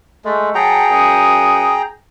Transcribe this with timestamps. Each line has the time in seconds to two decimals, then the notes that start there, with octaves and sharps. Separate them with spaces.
0.25 G#3 A3
0.55 F#3 G#4 F#5 G5 A5 A#5
0.90 F#2 F#5 D#6